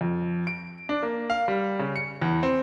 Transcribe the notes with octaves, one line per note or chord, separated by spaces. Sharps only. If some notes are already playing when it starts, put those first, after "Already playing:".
F2
D7
D4
A#3
F5
G3
C#3
C#7
E2
C4